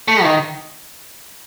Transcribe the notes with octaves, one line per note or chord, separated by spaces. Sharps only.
A3
D#3